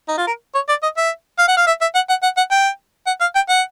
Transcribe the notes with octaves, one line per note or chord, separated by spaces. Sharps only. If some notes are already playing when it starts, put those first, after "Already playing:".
D#4
F4
A#4
C#5
D5
D#5
E5
F5
F#5
F5
E5
E5
F#5
F#5
F#5
F#5
G5
F#5
F5
G5
F#5